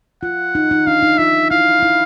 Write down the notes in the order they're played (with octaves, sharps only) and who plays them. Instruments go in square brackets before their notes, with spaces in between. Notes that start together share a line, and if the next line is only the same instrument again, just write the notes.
[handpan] F4 [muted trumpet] F#5
[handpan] D#4
D#4
[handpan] D4 [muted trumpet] F5
[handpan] D#4
[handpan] F4 [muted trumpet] E5
[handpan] E4 [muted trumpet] F5
[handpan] E4